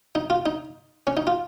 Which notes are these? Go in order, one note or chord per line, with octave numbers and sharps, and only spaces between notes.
D#4
F4
D#4
C#4
D#4
F4